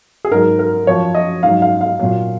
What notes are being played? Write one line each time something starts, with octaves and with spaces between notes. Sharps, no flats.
G#4
G#2 F#3 A#4
A#4
F#2 F3 C#5
D#5
G#2 F#3 F5
F5
F5
A#2 F#3